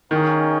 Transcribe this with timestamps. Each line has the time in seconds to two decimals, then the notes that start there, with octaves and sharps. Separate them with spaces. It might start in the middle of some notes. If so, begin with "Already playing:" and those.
0.11 D#3 A#3 C#4 G#4 D#5